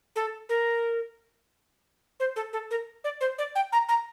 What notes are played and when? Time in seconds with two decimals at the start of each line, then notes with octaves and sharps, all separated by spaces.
0.16 A4
0.49 A#4
2.20 C5
2.36 A4
2.53 A4
2.71 A#4
3.04 D5
3.21 C5
3.38 D5
3.55 G5
3.72 A#5
3.89 A#5